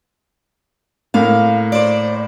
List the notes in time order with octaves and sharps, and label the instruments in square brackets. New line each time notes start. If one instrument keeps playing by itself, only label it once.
[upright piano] A2 A#3 [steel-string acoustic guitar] F5
[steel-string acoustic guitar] C5 D5